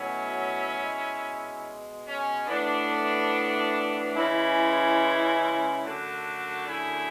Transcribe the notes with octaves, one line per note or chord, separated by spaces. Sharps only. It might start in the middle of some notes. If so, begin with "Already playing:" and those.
Already playing: B2 F#3 A3 C#4 E4
B2 G#3
C#4
A2 E3 A3 B3 D4
C#3 E3 G#3 C#4 E4
F#2 D3 A3 D4 F#4
E4 G#4